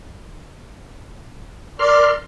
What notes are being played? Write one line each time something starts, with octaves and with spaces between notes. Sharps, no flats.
A#4 D5 C6 F6